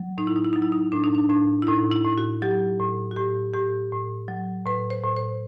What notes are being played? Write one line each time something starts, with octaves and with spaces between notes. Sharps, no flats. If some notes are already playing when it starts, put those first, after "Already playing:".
Already playing: F#3
A2 D#4
E4
D#4
E4
F#3 D#4
E4
D#4
A2 D4
D#4
D4
A2 D4
E4
A2 D#4
E4
A2
F#4
F#3 G4
A2
F#4
A2 G4
A2 G4
A2
F#3
A2 B4
C5
A2
C5